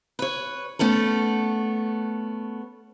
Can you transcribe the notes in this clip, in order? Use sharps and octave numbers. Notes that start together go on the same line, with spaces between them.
B4 C#5
A3 B3 C#4 A4